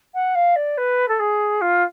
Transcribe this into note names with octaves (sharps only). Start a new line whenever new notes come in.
F#5
F5
D5
B4
A4
G#4
F4